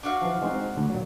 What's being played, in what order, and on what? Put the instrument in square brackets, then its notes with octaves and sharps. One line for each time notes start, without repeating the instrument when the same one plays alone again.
[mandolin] D4 F#4 F5
[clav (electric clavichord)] E3 F3
G#3 C4 D#4
D2
A#2 F#3